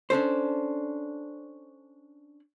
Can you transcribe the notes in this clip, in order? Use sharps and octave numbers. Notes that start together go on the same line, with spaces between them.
C#4 D4 A4 C5